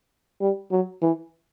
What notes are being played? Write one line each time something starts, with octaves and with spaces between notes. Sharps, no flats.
G3
F#3
E3